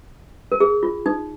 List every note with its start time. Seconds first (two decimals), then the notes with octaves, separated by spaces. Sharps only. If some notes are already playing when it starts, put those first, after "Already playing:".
0.52 A#4
0.60 G#4
0.83 F4
1.06 D#4